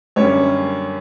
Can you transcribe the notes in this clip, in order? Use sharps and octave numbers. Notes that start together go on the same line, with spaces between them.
F#2 D3 G3 A#3 C#4 C#5